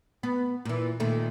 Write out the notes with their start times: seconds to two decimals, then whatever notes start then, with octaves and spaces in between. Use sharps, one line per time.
0.23 B3
0.65 A#2 E3
1.00 A#2 D#3 A3